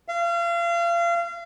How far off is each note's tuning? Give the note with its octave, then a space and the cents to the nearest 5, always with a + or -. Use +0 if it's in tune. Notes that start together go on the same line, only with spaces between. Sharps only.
F5 -35